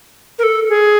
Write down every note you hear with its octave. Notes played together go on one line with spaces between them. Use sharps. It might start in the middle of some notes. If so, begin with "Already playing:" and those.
A#4
A4
G#4